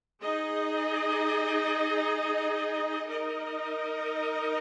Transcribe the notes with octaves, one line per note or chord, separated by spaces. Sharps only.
D#4 G#4 D#5
D#4 A#4 D#5